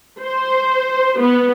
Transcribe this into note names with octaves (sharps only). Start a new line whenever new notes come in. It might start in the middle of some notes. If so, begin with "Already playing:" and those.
C5
B3